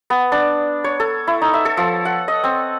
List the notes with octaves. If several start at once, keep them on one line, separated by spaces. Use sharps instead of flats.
B3
D4
C#5
A4
E4
D#4
E5
A4
F3
F#5
D#5
C4